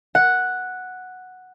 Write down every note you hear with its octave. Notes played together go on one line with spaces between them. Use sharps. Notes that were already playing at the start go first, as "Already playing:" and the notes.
F#5